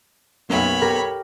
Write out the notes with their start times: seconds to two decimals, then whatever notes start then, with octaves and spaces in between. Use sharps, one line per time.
0.50 B1 F#2 A#3 B3 C#5 B5
0.81 G4 A#4